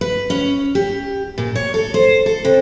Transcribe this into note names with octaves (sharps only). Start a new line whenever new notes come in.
B4
C#4
G4
A#2
C#5
A4
C5
A4
C3